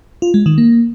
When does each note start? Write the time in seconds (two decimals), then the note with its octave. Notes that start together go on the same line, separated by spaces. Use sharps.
0.22 F4
0.34 G#3
0.46 D#3
0.58 A#3